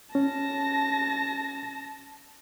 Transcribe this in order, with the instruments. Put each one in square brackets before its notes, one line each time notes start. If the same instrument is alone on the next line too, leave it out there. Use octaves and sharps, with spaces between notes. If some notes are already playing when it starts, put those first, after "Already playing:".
[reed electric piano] C#4 [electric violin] A5 A#6